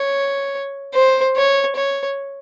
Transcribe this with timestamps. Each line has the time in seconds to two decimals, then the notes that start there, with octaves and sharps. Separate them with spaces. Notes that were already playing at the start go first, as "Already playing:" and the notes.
Already playing: C#5
0.94 C5
1.36 C#5
1.76 C#5